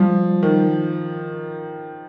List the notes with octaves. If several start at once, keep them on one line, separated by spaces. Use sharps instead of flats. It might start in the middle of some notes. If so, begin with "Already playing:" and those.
Already playing: F3 G3
D#3